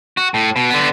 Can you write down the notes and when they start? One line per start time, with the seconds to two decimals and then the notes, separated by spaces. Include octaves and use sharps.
0.17 F#4
0.34 A2
0.56 B2
0.70 D3 B3